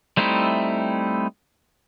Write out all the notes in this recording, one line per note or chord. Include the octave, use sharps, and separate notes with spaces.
G3 A3 C4 D#4 E4